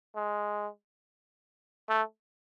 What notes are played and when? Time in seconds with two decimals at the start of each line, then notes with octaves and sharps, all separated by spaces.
0.16 G#3
1.89 A3